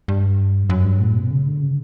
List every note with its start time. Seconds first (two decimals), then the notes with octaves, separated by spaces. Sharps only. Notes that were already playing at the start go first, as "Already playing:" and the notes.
0.08 G2
0.69 F#2
0.85 G2
1.00 A2
1.16 B2
1.31 C#3
1.47 D3
1.62 C#3